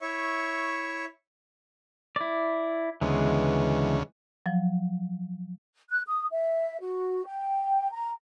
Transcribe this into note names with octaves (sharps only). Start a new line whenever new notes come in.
E4 C#5 E5 C#6
E4 D5
D2 C#3 E3 G#3 B3
F3 F#3
F#6
D#6
E5
F#4
G5
A#5